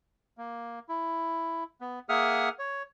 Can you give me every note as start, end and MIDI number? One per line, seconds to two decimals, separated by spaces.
0.38 0.79 58
0.89 1.64 64
1.81 1.99 59
2.09 2.49 58
2.09 2.49 68
2.09 2.49 76
2.09 2.49 78
2.09 2.49 87
2.09 2.49 89
2.59 2.83 73